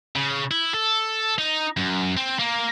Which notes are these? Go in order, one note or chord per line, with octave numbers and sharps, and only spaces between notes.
C#3
E4
A4
D#4
F#2
C4
A#3